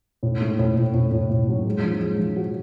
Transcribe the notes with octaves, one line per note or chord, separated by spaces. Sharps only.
A2
A3
A2
A2
A2
A2
A2
F#3
G#3
F3
G#3
F3
F#4